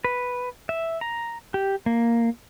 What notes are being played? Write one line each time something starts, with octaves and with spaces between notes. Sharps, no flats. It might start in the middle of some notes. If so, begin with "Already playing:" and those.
B4
E5
A#5
G4
A#3